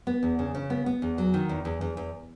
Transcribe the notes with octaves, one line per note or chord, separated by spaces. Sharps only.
B3
E2
C#3
C#3
B3
B3
E2
F#3
D#3
E2
E2
E2
E2